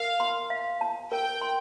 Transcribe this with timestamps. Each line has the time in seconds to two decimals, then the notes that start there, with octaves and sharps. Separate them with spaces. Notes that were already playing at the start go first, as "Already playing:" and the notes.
Already playing: A#4 F5
0.20 C6
0.50 F5
0.81 A5
1.12 A#4 G5
1.41 C6